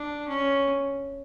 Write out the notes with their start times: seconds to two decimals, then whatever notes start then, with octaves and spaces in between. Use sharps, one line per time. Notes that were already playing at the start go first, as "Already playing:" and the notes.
Already playing: D4
0.28 C#4